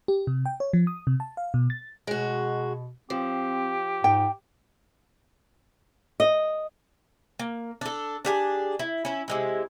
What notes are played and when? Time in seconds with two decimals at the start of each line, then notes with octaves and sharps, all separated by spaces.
0.08 G4
0.27 C3
0.46 G5
0.60 C#5
0.73 F3
0.87 D#6
1.07 C3
1.20 A5
1.37 F5
1.54 B2
1.70 A6
2.07 B2 G#3 F#4
3.10 F3 C4 G4
4.04 G#2 G5
6.20 D#5
7.39 A#3
7.81 D4 A4
8.25 D4 G4 G#4
8.79 E4
9.05 C#4 E4
9.28 C3 G#3 E4